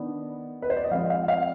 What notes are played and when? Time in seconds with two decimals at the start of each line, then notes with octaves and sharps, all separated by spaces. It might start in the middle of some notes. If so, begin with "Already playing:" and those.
Already playing: D#3 B3 D4
0.62 B4
0.70 C5
0.77 D5
0.84 D#5
0.91 F3 G#3 C4 F5
1.10 F5
1.28 F5